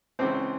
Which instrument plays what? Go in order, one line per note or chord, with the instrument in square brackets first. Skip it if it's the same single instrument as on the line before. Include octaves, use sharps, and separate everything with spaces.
[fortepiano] C#2 C#3 E3 C4 C5